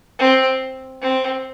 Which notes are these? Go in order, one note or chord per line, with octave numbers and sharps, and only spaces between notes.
C4
C4